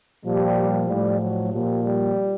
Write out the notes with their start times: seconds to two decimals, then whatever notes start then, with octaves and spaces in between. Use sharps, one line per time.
0.25 A#2 F3 G3
0.88 A2 F3 G3
1.19 F#3
1.51 A#2 F3 G3
1.83 G3